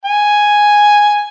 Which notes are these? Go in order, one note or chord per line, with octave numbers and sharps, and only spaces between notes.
G#5